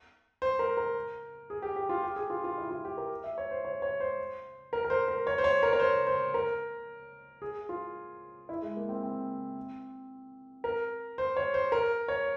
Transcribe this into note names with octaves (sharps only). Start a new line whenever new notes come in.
C5
A#4
A#4
G#4
G4
G4
F4
G4
G#4
F4
F4
E4
F4
G4
A#4
E5
C#5
C5
C#5
C#5
C5
A#4
A#4
C5
A#4
C#5
C5
C#5
A#4
C#5
C5
C5
A#4
G#4
F4
E4
G#3
A#3
C4
C4
A#4
C5
C#5
C5
A#4
C#5